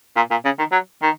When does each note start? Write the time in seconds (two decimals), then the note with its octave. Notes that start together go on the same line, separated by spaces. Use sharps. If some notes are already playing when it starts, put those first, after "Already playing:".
0.16 A#2
0.31 A#2
0.45 C#3
0.58 D#3
0.72 F#3
1.02 D#3